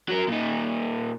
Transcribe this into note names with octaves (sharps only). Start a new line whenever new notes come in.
F#3 A#4
A#2 D#4